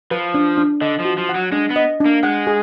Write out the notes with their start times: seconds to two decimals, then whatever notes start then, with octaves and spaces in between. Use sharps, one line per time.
0.11 F3 B4
0.34 D4
0.58 D4
0.81 D3 D#5
1.00 F3
1.05 F#4
1.18 F3
1.29 F#5
1.35 F#3
1.52 G#3 D4
1.70 B3
1.76 D#5
2.00 D4
2.05 A#3
2.23 G#3 F#5
2.47 G#4